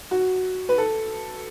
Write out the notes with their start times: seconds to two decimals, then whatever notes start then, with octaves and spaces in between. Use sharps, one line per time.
0.11 F#4
0.69 B4
0.78 A4